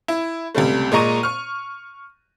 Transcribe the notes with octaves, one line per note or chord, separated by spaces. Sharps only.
E4
C#2 C3 G3 A3
A#2 G#3 D#5 A#5 C#6 D#7
C#6 F6